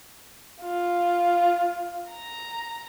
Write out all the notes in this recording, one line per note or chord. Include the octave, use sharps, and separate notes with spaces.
F4
A#5